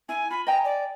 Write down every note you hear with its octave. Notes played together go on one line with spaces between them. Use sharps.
E4 G#5
F4 B5
D#5 G5 G#5 A#5
D5